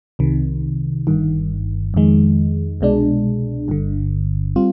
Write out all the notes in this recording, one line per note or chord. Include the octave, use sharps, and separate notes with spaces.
C2 C3 D#3
G1 G2 D#3
F2 D#3 G#3
C2 B2 G#3 D4
G1 G2 D3
G3 C4 F4